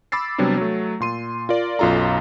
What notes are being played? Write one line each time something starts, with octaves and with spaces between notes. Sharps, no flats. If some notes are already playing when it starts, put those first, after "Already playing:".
B5 D6 E6 A6 C7
C3 F#3 G3 B3 D4
F#3 A3
A#2 C6 D#7
F4 A#4 D5
B1 F#2 F4 A4 A#5